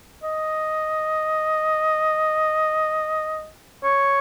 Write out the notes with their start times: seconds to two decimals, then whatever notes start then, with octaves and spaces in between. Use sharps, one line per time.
0.24 D#5
3.84 C#5